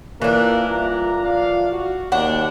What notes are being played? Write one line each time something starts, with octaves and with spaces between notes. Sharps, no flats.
E3 A#3 D4 E4 F4 A#4
C2 F4 A#5
A#1 D5 F5
F#4
D#2 A#3 D4 F#5